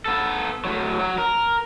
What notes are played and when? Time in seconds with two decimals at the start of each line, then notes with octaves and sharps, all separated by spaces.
0.06 B3 A4
0.65 A2 F#3
0.99 F#3
1.18 A#4